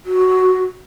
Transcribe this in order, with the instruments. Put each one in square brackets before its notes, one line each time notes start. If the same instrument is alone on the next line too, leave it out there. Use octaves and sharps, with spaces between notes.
[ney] F#4